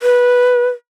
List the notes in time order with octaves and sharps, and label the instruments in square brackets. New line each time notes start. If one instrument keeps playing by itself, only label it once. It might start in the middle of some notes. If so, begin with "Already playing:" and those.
[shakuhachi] B4